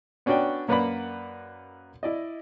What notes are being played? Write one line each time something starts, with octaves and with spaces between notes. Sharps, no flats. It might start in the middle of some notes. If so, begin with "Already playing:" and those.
B3 C#4 D4 F#4 D5 G5
F#2 A#3 B4 D5 F#5 B5
E4 D5 D#5